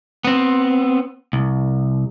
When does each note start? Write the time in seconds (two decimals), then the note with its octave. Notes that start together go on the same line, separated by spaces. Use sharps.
0.25 B3 C4
1.33 C2